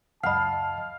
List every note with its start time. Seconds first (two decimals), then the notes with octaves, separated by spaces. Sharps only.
0.23 C#2 F#2 D#5 F5 F#5 A5 B5